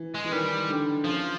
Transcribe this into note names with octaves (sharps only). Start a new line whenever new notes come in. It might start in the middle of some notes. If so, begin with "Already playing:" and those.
Already playing: E3
G#3
E3
D#3 G3
D3
C#3 F3